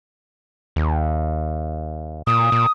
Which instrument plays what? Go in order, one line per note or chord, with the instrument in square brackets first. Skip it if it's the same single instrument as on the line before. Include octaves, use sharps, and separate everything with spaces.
[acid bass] D#2
[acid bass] A#2 [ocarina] D#6
[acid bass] A#2